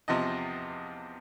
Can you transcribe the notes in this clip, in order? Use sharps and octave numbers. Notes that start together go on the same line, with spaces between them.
E2 C3 F3 D#5